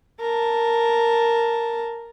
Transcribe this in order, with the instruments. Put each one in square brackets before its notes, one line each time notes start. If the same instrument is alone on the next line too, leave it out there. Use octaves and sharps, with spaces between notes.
[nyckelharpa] A#4 A5